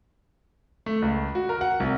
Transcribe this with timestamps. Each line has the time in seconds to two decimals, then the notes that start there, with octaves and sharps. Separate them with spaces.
0.86 A3
1.02 C#2
1.35 F#4
1.49 A#4
1.61 F#5
1.80 C2